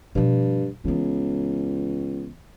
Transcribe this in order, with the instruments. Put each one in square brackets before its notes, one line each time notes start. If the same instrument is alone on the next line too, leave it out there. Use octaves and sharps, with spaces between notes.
[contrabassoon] G2 [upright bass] B2 F3
[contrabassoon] C#2 [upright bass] E3 B3